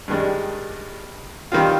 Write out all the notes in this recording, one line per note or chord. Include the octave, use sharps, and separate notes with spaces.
G2 D#3 G#3 D4
D#3 G3 C4 F4